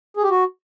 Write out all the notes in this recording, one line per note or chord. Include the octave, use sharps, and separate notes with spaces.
G#4
G4
F#4